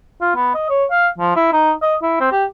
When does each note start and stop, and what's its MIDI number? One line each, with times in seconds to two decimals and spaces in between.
0.21 0.32 65
0.36 0.51 59
0.54 0.65 75
0.69 0.85 73
0.91 1.08 77
1.18 1.35 53
1.36 1.52 64
1.53 1.71 63
1.82 1.95 75
2.02 2.18 64
2.21 2.28 60
2.32 2.45 67